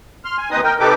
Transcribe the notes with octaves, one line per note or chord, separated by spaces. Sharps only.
C6 F6
G#5
D#2 C4 D#4 B4 D#5 D#6
A#4 G5
C3 D#4 G4 A4 B4 D6